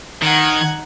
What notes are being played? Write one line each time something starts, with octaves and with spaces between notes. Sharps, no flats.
D#3 D#4 F#5 F#6 G#6